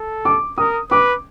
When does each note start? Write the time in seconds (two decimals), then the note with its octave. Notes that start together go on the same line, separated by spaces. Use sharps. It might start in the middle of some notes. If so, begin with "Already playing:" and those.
Already playing: A4
0.25 D6
0.58 A#4 D#6
0.91 B4 D6